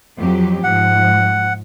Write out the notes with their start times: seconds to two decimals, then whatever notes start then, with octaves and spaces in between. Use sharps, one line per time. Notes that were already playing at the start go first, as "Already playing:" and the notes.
0.17 F2 F#3 G4
0.64 G#2 F3 F#5